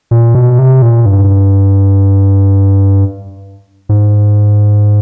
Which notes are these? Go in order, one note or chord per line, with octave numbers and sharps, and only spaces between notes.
A#2
B2
C3
A#2
G2
G#2